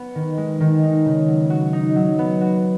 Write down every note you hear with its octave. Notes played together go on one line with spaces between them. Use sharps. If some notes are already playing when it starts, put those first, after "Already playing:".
Already playing: B3
D#3
G#3
D#3
D#4
C#3
F#3
F#4
D#4
F#3
B3
F#4